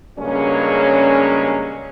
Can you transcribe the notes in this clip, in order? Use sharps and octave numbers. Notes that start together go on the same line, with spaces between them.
G2 C#3 F#3 G#3 A#3 C#4